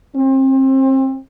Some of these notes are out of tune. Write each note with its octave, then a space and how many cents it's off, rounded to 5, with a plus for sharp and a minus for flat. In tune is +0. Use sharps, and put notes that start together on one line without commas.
C4 +30